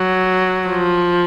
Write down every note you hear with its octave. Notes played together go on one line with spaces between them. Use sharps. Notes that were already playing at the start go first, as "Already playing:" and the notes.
Already playing: F#3
F3